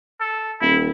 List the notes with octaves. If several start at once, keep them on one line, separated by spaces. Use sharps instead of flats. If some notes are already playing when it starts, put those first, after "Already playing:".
A4
D#1 E4